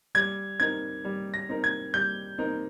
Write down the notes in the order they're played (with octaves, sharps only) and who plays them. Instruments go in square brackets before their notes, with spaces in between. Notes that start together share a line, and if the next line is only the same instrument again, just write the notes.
[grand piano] G3 [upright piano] G#6
[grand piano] C4 D#4 A#4 [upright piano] G#6
[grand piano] G3
[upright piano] A#6
[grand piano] C4 D#4 A#4
[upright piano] G#6
[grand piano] G3 [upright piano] G6
[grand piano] C4 D#4 A#4